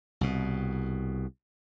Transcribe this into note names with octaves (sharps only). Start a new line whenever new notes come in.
C2 B2